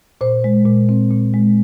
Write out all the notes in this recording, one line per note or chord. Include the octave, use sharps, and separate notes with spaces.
A#2 C5
G#3
A#2
C4
A#2
G#3